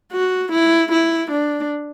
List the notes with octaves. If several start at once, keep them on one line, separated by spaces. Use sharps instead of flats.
F#4
E4
E4
D4